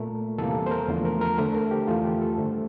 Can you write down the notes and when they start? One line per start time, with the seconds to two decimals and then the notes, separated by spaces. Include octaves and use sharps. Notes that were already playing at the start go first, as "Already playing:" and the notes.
Already playing: A#2 A3 A#4
0.38 E2 C3 E3 G3 A#3 A4
0.66 C5
0.71 A#4
0.88 E2 D3 F3 A3
1.05 A#4
1.21 A#4
1.38 D2 D3 A3 C5
1.55 A#4
1.71 G4
1.88 F2 E3 A3 F4
2.04 G4
2.21 A4
2.37 G2 D3 A3 C5